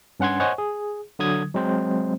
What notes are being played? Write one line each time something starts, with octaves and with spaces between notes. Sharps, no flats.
G2 C#4 F#5 C6 G#6
C5 C#5 D#5 F#5 G#5 C#6
G#4
D3 F#3 D#6 G#6
F#3 G#3 C4 C5